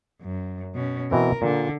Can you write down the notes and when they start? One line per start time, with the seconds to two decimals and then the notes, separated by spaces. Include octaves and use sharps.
0.22 F#2
0.75 B2 C#4
1.11 B2 E3 C4 A#4
1.42 A#2 D3